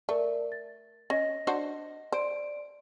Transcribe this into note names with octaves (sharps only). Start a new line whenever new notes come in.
A3 A#4 D5
A6
C#4 D#5 A#6
D4 F#4 C5
C5 D5 D7